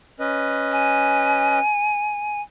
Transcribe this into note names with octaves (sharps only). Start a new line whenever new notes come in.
C#4 B4 D#5
G#5